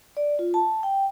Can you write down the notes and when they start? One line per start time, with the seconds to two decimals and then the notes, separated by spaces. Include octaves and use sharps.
0.17 D5
0.39 F4
0.54 A5
0.83 G5